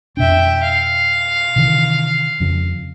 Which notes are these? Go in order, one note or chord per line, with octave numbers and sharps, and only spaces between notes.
F2 B2 D4 E5 G5
F5
C3 D#3 E3
F2 C#3 F3